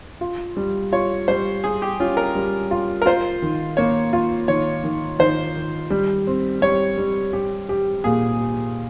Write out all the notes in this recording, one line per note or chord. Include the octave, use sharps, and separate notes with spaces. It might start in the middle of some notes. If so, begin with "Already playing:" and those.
F4
G3
F4 C#5
G3 C5
G3 G#4
G4
C#4 F4
A#4
G3
F4
A#4
F4 C5
D#3
A#3 C#5
F4
D#3 C#5
D#3
D#3 C5
D#3
G3
C4
G3 C#5
G3
G4
G4
A#2 G#4
G4